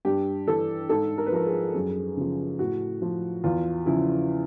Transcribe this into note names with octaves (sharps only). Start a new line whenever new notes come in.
G2 G4
E3 A4
G#2 A4
A#4
B4
F3 A#4
G#4
F#2 G#4
C#3 F3
A2 F#4
F3
E2 F4
C#3 F3 E4